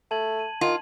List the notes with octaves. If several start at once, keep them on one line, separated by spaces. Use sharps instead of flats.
A3 A5 G#6 F#7
D#7
D#3 F4